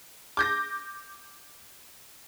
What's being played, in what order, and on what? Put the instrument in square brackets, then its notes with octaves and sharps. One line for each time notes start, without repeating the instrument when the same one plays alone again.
[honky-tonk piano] D6 G6 A#6